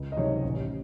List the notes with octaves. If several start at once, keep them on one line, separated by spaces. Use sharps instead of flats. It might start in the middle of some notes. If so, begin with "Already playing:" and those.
Already playing: C#2
D#5
C3 D#3 F#3 C#5
A1